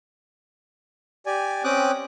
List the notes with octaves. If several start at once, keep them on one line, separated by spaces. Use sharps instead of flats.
G4 D5 G#5
C4 C#4 G5 D6 D#6 F#6